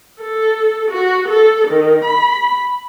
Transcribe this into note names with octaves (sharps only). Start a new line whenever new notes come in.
A4
F#4
A4
D#3
B5